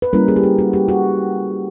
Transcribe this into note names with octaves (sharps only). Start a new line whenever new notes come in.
B4
G3 A#3 C#4 E4 A#4
G#4
G4
G#4
F#4
G4
F#4